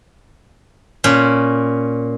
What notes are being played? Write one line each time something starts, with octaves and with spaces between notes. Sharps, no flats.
A#2 C#4